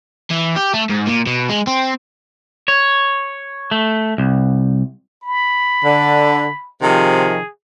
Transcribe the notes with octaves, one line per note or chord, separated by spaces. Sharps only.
E3
G4
A3
G#2
A#2
B2
G#3
C4
C#5
A3
C2
B5
D3
C3 D#3 F3 G#4